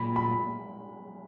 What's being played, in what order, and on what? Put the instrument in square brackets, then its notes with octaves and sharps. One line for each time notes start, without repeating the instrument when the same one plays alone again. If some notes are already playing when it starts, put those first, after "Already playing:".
Already playing: [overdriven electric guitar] A#2 [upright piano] B5
[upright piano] B5